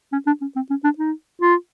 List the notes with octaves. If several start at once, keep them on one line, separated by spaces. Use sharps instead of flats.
C#4
D4
C#4
C4
C#4
D4
D#4
F4